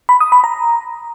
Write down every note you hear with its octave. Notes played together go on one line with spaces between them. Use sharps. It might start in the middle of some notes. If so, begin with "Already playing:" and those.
B5
D#6
B5
A#5